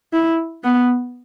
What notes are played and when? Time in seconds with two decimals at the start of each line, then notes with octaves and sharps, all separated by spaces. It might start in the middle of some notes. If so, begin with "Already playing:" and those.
0.13 E4
0.64 B3